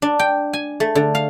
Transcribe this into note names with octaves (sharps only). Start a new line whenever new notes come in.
D4
G5
G#5
A3
D3
F5